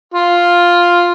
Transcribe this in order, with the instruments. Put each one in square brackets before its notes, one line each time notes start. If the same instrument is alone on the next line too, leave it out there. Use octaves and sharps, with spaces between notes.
[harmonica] F4